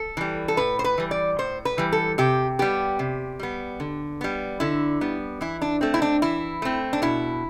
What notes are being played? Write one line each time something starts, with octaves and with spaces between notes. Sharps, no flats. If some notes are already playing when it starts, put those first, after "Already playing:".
Already playing: A4
E3 G3
A4
A2 B4
C5
B4
E3 G3
D5
A2 C5
B4
E3 G3
A4
C3 G4
G3 B3 G4
C3
G3 B3
D3
G3 B3
D3 E4
G3 B3
E3 E4
D4
A3 C4
E4
D4
E3 E4
A3 C4
D4
B2 E4